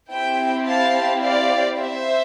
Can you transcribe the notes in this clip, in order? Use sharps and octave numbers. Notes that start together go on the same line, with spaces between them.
C4 E4 G4 E5 G5
F5 A5
D5 F5
C5 E5